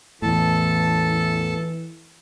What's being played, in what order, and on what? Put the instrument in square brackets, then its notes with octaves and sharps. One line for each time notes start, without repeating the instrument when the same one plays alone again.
[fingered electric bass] E2 A2 [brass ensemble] E3 [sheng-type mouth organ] A4 A5